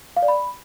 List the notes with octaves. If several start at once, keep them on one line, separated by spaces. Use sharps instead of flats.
F5
D5
B5